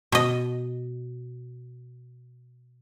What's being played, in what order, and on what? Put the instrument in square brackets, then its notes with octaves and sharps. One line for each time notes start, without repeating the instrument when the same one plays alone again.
[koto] B2 D#5